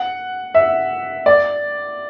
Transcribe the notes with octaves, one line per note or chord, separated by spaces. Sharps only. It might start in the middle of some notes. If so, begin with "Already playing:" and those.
Already playing: F#5
E5
D5